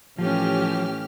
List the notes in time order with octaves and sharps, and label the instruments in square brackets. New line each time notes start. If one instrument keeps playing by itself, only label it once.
[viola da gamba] A2 E3 C#4 [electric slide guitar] F3 [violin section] G4 F6